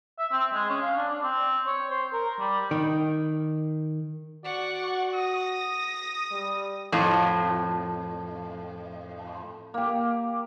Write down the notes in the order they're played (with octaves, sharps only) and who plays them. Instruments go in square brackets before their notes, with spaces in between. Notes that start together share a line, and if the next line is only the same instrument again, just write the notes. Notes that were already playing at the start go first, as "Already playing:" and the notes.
[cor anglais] E5
C4
G#3
C#4
F5
D4
D5
C4
C#5
C5
A#4
G3
[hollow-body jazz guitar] D#3
[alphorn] F#4 [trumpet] D5 [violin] F#5 C#6
[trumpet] D#6 [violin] A#6
[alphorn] G3
[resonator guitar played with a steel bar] F2 A2
[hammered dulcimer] A#3 G4